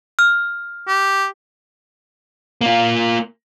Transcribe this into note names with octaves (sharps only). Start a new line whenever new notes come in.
F6
G4
A#3 F4